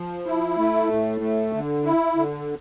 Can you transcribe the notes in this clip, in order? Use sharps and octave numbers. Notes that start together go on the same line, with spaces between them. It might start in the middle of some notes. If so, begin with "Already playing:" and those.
Already playing: F3
E4
A3
A2
A3
D3
E4
D3